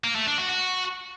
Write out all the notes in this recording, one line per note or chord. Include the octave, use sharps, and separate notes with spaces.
A#3
A3
D4
F#4
F#4